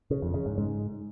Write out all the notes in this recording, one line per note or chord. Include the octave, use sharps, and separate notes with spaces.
C#3
F2
C#3
G#2
G#2